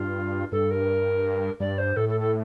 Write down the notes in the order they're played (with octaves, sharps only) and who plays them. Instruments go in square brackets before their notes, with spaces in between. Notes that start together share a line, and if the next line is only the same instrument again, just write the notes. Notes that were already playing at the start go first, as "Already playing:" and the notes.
Already playing: [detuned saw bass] G2 [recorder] F4
[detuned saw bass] G2 [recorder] A4
[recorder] A#4
[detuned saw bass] G2 [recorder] D5
[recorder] C5
[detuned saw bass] A2 [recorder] A4
[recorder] A4
A4